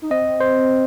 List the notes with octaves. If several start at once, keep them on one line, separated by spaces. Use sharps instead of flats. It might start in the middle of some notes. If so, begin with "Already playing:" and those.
D#4
C4 D#5
C5